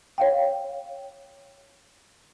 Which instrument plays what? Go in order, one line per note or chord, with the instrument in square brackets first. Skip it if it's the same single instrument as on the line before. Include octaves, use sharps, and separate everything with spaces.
[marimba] C#5 F5 G5